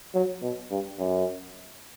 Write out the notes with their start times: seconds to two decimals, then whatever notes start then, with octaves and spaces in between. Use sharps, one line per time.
0.15 F#3
0.42 B2
0.71 G2
0.99 F#2